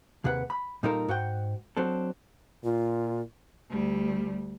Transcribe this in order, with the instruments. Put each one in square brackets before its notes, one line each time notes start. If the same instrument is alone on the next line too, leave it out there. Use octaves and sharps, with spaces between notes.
[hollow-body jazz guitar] D#2 C3 G#4 B4 F#5
B5
A#2 G3 D#4 F4 A4 A#4
G#2 F#4 F#5 G5
F#3 C4 D4 A4
[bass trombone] A#2 [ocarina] F4
[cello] D2 G3